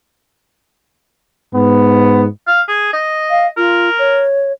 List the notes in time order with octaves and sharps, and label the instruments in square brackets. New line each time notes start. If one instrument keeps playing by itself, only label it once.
[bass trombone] G#2 [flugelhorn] B3
[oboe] F5
G#4
D#5
[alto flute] F5
[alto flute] F4 [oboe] A#4
[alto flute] C#5